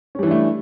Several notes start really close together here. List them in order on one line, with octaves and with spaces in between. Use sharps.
C#4 G3 E3 D4 A3